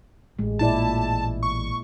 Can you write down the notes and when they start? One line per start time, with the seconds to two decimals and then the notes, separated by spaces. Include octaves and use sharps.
0.39 A1 G#3
0.59 A#2 E4 D5 A5
1.43 C#6